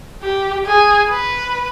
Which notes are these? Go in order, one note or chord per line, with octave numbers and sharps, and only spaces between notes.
G4
G#4
B4